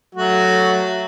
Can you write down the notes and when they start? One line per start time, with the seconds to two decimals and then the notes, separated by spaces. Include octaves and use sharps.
0.15 F#3 A3 F#4